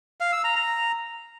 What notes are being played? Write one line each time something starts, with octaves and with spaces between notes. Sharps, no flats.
F5
E6
A#5
A#5